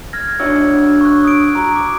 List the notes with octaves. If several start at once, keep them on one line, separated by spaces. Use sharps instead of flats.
F6 G#6 A#6
D4 F#4 C#5 E6
C#6 F#6
D#6 D7
F#4 A#5
D6